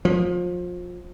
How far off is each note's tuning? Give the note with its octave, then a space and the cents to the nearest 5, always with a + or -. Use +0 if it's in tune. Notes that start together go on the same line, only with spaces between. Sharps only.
F3 +25